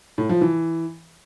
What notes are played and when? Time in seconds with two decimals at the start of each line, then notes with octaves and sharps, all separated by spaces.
0.18 A2
0.29 F3
0.41 E3